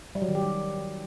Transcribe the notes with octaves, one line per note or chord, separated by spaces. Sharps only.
G3
F#3
D#3
G4
G3